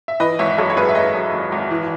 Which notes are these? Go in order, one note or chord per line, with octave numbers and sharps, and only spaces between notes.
E5
E3 B4 D#5
G#1 C#5 E5
F#2 A4 C#5
C#5
G#1 G#4 B4
E5
G#1 B4 D#5
F#2
G#1
G#1
E3